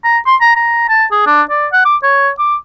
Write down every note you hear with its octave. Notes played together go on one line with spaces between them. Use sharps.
A#5
C6
A#5
A#5
A5
G#4
D4
D5
F#5
D6
C#5
D6